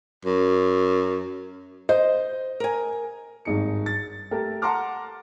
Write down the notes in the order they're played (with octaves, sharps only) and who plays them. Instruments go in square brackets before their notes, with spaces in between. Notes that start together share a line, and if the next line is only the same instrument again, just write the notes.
[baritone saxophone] F#2
[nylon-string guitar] C5 [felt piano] D#5
[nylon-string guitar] A#4 G#5
[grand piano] G#1 G2 D#4 G#4 C#7
A6
A3 G4 A4 A#4
F#5 A5 A#5 C6 D6 F6